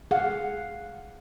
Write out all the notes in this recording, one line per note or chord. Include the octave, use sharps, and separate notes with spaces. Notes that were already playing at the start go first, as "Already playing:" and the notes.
G#4 F5 F#5